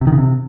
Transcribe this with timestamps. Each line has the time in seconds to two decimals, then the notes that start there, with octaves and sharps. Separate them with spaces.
0.01 C3
0.07 D#3
0.12 C#3
0.18 C3